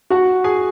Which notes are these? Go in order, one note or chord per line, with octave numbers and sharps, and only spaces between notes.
F#4 F#5
G#4 G#5